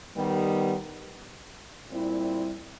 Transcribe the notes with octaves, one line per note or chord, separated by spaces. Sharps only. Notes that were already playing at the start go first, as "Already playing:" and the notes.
D#3 G3 B3
A#2 G3 C4 E4